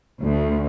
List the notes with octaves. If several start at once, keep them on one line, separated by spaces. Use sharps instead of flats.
D2